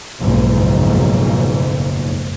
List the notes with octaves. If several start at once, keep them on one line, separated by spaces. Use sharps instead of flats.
F#1 B1 F2 G#2